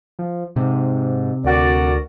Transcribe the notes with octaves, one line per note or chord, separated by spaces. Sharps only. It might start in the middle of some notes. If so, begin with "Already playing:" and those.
F3
G#2 C3
D2 F#4 A#4 D5